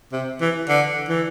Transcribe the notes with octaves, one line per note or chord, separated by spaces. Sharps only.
C3
E3
D3
E3